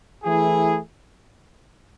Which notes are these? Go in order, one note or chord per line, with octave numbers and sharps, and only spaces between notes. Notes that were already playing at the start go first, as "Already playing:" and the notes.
E3 A3 E4 G#4